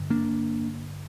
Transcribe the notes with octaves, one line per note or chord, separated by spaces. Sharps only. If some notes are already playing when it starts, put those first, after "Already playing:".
Already playing: G2 D3
A#3 D4